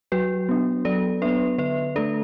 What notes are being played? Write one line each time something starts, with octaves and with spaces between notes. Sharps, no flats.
F#3 F#4 B4
B3 D4
F#3 A4 D5
B3 D4 B4 E5
D3 B4 E5
A3 D4 A4 D5